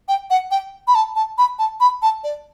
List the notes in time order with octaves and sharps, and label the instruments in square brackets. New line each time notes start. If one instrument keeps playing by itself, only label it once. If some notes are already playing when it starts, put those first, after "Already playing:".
[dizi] G5
F#5
G5
B5
A5
A5
B5
A5
B5
A5
D5